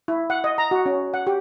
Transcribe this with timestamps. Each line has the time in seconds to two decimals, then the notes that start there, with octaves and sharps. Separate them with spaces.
0.08 E4
0.30 F#5
0.44 D#5
0.58 A#5
0.71 F#4
0.86 C#4
1.14 F#5
1.27 G4